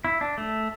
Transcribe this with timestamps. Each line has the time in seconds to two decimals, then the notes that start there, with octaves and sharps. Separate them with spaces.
0.05 E4
0.21 D4
0.38 A3